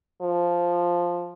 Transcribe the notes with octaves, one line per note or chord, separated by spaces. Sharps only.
F3